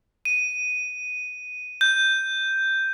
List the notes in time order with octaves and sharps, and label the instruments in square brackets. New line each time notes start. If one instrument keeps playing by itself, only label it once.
[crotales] D#7
G6